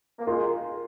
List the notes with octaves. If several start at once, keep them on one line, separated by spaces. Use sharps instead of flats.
A#3
D#3 G#3 F4